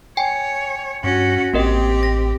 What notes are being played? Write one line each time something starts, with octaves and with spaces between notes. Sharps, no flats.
C#5 G5 G#5
G2 C#4 F#4
A1 A#3 C4 G4 A#4 D#5
A#6